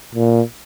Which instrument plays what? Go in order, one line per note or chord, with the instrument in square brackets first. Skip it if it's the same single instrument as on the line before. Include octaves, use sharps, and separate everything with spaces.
[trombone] A#2